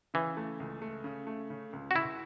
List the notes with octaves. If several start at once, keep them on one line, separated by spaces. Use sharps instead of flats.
C#3 E3
A3
C#2
A3
C#3
A3
C#3
C#2
F#4
C#2 E4